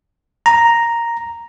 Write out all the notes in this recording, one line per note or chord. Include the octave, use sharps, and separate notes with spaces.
A#5